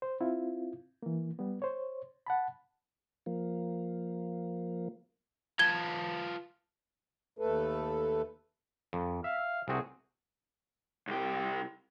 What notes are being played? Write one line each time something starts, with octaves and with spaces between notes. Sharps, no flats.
C5
C4 E4 F4
E3 A#3
G3 B3
C5 C#5
F#5 A5 B5
F3 A#3
F4 B4 A5 G#6 G7
D#2 A3 A4 B4
F2
E5 F5
C2 C4 F#4 G#4
C2 G4